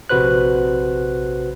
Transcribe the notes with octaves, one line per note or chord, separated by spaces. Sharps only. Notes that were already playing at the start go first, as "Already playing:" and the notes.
A#1 C3 F#4 B4 C5 F#6